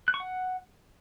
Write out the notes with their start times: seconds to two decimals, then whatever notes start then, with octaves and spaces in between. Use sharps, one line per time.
0.08 F#6
0.14 C#6
0.20 F#5